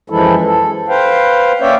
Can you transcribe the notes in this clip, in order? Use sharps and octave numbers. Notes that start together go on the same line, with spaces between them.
F#2 E3 F3 G#3 E4 A4
A4
B4 C5 F5 G5
A#3 C#4 C#5 D5 E5 G5